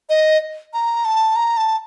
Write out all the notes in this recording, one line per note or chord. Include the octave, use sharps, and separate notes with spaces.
D#5
A#5
A5
A#5
A5